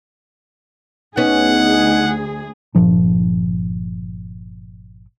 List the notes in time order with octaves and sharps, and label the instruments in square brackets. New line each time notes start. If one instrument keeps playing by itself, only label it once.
[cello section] D2 G#4 [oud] B3 C#4 [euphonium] D#4 [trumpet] F#5
[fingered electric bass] G1 A#2 F3 D4